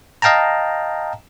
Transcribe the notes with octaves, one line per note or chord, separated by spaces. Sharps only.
D#5 F5 G5 A5 A#5